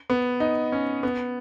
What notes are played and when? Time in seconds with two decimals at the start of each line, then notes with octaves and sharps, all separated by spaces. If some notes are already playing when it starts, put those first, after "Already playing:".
0.10 B3
0.40 D#4
0.72 C#4
1.03 B3